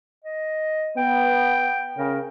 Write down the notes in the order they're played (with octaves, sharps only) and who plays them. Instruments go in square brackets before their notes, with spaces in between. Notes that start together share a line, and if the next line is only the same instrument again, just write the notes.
[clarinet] D#5
[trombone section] B3 [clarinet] G5
[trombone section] C#3 [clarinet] A#4